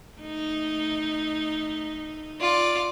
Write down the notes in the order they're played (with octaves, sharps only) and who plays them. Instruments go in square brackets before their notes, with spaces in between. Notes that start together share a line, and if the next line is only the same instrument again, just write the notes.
[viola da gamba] A3 D#4
[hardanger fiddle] F4 D5